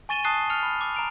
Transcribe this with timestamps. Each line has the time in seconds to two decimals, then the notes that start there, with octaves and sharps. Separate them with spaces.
0.09 G#5 C#6 A6 D#7 E7 G7
0.24 A5 D#6 F#6 C7 G7
0.50 F6 C#7 F7
0.63 B5
0.81 D6
0.94 A#5 D7 F7